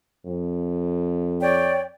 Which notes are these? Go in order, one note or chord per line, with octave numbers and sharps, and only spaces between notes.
F2
C#5 D5 G5